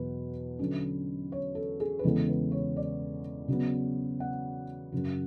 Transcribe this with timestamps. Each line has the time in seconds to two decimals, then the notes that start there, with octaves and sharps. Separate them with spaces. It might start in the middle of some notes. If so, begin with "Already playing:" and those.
Already playing: E2 B2 F#3 B4
0.59 D3 F#3 C#4
1.32 C#5
1.55 A4
1.80 G#4
1.99 B4
2.04 E2 C#3 E3 G#3 B3 A4
2.28 B4
2.52 C#5
2.76 D5
3.48 C#3 F#3 B3
4.20 F#5
4.92 F#2 C#3 F#3